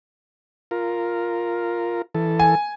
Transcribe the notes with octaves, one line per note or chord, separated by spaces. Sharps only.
F4 A#4
E3 A4
G#5